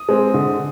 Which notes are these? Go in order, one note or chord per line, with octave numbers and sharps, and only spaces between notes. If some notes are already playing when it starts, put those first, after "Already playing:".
Already playing: D#6
G#3 C4
D3